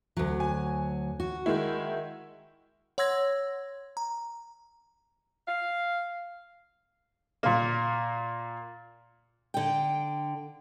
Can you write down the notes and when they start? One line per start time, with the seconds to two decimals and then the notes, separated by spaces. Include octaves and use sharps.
0.17 D2 F#3
0.40 G#5
1.20 F#4
1.46 D#3 G#3 E4
2.98 C#5 F#5 C6 E6 G#6 A#6
3.97 A#5
5.47 F5
7.43 A#2 A#3
9.54 D3 G5